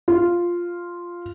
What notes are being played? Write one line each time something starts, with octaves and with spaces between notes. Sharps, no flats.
F4